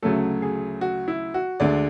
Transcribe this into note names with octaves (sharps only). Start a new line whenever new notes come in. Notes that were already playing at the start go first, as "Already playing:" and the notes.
D2 C#3 F#3 A3 A4
G#4
F#4
E4
F#4
D2 D3 G#3 D5